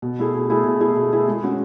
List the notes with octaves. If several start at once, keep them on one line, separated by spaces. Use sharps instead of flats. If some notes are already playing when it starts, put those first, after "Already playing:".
B2
A3 E4 G#4
B2
A3 E4 G#4
B2
A3 E4 G#4
B2
A3 E4 G#4
G#3
C#4 F#4